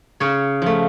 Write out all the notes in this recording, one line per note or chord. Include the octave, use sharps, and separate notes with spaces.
C#3 C#5
F3 A3